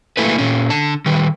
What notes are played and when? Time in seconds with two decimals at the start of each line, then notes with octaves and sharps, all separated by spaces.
0.17 A3 A#3 E4 G#4 A4 B4
0.38 A#2 C#4
0.70 D3 A5
1.06 D#3 G3 B4